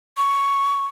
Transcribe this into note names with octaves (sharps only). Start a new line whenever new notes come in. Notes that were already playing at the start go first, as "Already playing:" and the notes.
C#6